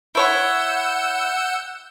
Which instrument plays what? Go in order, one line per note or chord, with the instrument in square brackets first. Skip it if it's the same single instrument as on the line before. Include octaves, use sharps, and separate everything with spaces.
[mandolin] E4 C#5 [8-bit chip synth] F#5 E6 G6